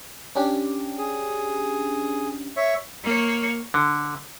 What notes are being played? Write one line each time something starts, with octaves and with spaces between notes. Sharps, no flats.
C#4 D4 G4
G#4
C#5 E5
A#3 C#5
D3